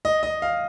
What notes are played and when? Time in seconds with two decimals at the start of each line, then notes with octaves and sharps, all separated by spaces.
0.05 D#5
0.23 D#5
0.42 F5